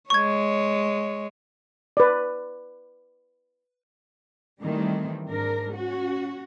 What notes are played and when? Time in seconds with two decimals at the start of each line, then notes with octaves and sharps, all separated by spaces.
0.10 G#3 C#5 C#6 G#6
1.97 B4 D5
4.62 D#3 E3 G3 A3 C4
5.27 G#2 D4 A#4
5.74 C#4 F#4